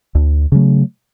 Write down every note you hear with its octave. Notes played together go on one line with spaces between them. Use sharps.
D2
C#3 F#3 A3